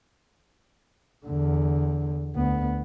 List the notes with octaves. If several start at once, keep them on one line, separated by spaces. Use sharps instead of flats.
E2 D3
D2 B3